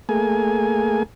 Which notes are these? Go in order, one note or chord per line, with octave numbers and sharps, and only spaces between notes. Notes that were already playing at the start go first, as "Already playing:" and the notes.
A3 A#3 G#4 G#5